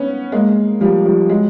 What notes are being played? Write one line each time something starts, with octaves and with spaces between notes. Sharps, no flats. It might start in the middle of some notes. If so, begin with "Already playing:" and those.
Already playing: B3 C#4
G#3 A#3
F3 G3
F3 G3
F#3 G#3